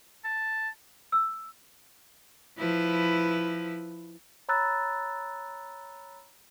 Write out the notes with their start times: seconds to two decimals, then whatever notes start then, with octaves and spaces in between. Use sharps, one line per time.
0.25 A5
1.12 E6
2.58 F3 E4 B4
4.49 C#5 A#5 B5 E6 F#6 A6